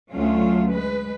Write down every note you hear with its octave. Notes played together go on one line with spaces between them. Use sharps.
D2 F#3 A3 C#4 F4
G#3 B4